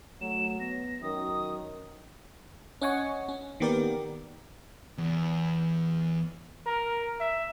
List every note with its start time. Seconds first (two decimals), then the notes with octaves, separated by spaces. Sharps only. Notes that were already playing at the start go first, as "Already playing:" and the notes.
0.21 F#3 A3 E7
0.60 B3 A#6
1.02 F#2 D#3 D#6
2.81 C#4 D#5 F#5 G#5 C#6
3.28 C#4
3.60 D#3 A#3 B3 G4 A#4 D5
4.98 E2
6.66 A#4
7.20 E5